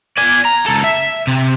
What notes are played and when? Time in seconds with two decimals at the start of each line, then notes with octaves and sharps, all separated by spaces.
0.18 D5 G#5
0.45 A#5
0.66 C#2 A4
0.84 E5
1.27 C3